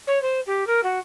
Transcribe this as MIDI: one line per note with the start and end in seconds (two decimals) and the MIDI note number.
0.07 0.21 73
0.21 0.40 72
0.46 0.66 67
0.66 0.80 70
0.83 0.99 66